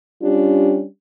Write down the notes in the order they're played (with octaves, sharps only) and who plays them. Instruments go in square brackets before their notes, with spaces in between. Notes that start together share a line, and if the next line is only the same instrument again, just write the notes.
[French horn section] G3 C#4 D4 F4 G4